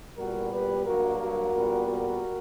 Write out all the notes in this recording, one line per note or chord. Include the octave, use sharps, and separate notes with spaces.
A#2 G3 B3 F#4 A#4
G4 B4
G2 F#3 A#3 F#4 A#4
F#4 A#4
A#2 G3 B3
F#4 A#4